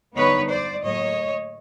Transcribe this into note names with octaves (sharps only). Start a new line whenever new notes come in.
D3 G3 B3 D#4 B4 C#5
C5 D5
A2 F#3 A#3 C#5 D#5